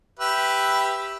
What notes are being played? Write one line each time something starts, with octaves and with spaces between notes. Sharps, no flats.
G4 B4 E5